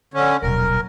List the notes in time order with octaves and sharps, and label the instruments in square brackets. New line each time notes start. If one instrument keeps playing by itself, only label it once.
[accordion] D3 C#4
[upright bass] D#1 B1 [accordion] A#4